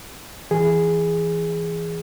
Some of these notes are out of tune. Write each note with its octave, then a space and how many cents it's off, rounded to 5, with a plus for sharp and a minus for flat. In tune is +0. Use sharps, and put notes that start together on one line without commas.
E3 +0 G#4 -5